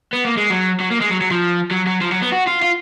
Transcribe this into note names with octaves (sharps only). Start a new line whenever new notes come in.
B3
A#3
G#3
F#3
F#3
A#3
G#3
F#3
F#3
F3
F#3
F#3
F3
F#3
B3
F#4
F4
F4